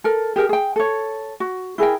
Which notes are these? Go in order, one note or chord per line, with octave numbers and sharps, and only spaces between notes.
A4 A#4
G4 G#4 A#4 G5
G#4 G5
A4 C#5
F#4
E4 G#4 A#4 G5